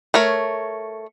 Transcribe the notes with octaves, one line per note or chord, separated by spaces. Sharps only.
A3 A#4 C#5